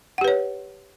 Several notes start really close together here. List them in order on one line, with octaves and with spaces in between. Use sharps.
F#5 G4 B4 C#5